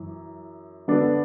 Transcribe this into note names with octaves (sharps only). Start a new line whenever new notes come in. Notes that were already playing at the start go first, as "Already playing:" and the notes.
Already playing: F#2 E3
D3 B3 D4 A4